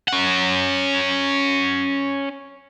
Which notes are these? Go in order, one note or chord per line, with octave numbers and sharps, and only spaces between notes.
C#4 F#5